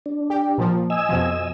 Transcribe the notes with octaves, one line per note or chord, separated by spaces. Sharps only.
D4
G4
A#2 F3
D#5 G#5 E6
F2 B2 F3